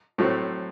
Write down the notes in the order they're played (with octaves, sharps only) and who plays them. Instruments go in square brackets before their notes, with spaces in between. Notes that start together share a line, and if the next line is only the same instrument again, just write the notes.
[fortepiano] A2 F#3 A3 C4